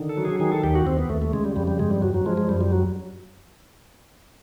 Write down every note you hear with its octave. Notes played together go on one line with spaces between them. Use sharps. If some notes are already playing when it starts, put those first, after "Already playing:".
Already playing: D3 D#3
A4
F#3
G#4
D#3 G#4
A4
D#2 G4
F#4
D#2 C4
B3
D#2 A3
A3
C#3 G#3
G3
F2 G3
G3
G2 G#3
G3
F#3
F#3
F3 G#3
G#3
F#2 G3
G3
F#3